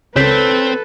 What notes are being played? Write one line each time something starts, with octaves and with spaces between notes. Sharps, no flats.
C#2 C4 A4 B4 C#5 G6 B6